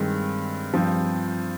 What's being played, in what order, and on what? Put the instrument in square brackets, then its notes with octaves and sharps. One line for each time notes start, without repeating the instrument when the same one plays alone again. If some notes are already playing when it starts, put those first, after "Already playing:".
Already playing: [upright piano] G2 D#3 G#3 C4
G2 F3 C4